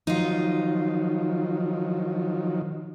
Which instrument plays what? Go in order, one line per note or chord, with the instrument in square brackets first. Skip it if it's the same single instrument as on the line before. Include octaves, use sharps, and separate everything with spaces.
[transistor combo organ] D#3 F3 F#3 [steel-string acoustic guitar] D#4 F4